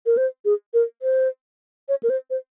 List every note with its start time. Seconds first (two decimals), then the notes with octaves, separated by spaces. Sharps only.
0.06 A#4
0.17 C5
0.45 G#4
0.74 A#4
1.02 C5
1.89 C#5
2.03 A#4
2.10 C5
2.30 C5